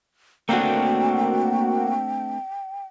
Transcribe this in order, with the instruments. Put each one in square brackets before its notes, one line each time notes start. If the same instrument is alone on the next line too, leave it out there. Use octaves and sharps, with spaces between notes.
[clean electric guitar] A3 C4 D4 [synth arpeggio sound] A#3 F#4 [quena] G5